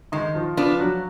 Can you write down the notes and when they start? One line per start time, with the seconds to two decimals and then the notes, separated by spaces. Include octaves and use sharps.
0.12 D#3 G#3 D#4
0.35 F3 F4
0.57 F3 B3 D4 F4
0.80 F#3 F#4